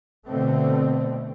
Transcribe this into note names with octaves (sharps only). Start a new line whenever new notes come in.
B2 D3 A3 C4